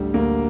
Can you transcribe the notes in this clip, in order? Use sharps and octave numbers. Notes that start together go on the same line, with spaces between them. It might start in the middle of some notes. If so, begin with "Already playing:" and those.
Already playing: A1 D2 D3 G3
D2 A#3